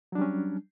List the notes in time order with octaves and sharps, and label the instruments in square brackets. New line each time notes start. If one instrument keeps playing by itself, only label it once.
[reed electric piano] F#3
D4
G3
C#4